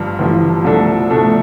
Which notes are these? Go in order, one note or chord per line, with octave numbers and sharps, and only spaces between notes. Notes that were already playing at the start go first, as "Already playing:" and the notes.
Already playing: G1 G2 F3
G1 G2 E3 F3
C2 B2 F3 A3 D4 A4
C2 B2 A3 D4 A4